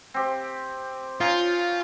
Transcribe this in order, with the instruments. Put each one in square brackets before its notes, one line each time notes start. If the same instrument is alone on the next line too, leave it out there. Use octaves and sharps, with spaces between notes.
[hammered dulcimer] C4 G4
[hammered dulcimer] C#4 D#4 [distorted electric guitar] F4